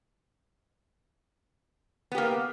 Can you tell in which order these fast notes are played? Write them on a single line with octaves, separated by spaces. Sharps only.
B3 G4 A#3